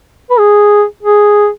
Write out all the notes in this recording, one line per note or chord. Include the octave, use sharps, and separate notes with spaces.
B4
G#4
G#4